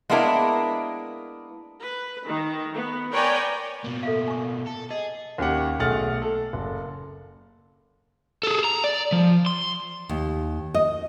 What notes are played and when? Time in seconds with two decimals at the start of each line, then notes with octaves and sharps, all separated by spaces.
0.10 G#3 A#3 B3 D4 E4 A#4
1.82 B4
2.26 D#3
2.76 B3
3.12 A#4 B4 C#5 D5 G5 G#5
3.84 B2 A#3
4.03 A4 E5 F5
4.28 G#5 C#6
4.66 A4
4.91 G#4 D#5
5.38 D#2 C#4 G4 F#5
5.79 B1 A3 G#4 F#5 F6 A6
6.22 A4
6.53 F#1
8.43 G#4 A4
8.64 A#5
8.84 D5
9.12 F3
9.46 C6
10.09 D#2
10.74 D#5